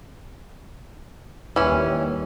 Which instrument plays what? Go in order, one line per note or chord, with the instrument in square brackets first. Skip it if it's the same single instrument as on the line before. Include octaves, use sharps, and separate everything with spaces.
[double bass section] D#2 G3 [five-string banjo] E3 C#4